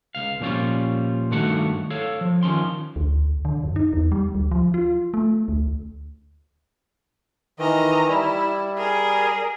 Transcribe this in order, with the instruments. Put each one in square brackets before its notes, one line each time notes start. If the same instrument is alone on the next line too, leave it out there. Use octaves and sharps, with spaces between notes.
[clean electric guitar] C#2 F5
A#2 F3 G3 C#4 F4
G2 D#3 A3 F#4 F#5
A4 C#5 F5
F3
D#3 F3 C#4 C6
[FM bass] D2
D3
F#2
D#4
E2
G3
D2
F3
F4
A3
D2
[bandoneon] D#3 E3 [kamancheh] D#5 A#5
[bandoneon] G3 [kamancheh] E4
[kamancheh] G#4 A#4